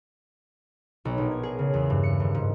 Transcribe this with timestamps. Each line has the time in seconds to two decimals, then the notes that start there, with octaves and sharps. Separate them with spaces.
1.05 B1
1.18 A#1
1.31 G#6
1.43 G#4
1.59 C#3
1.74 E2
1.90 G2
2.03 C#7
2.20 D#1
2.35 G#2